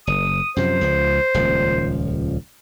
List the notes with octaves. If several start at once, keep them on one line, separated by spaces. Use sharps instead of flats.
F#1 D#6
F#2 C3 F3 C5
C#2 F3
D#1 C#2 F3